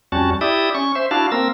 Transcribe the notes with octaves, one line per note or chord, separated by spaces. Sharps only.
F2 G3 C#4 F#4 A5
E4 G4 D5 E5 D#6
C#4 C#6
C5 E5
D4 E4 F#4 F5 A5
A#3 C4 A#4 E6